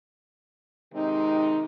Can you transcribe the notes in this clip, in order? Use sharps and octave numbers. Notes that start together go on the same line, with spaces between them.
C3 D#3 G#3 C4 D#4